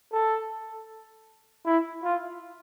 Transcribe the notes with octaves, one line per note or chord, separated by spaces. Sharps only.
A4
E4
F4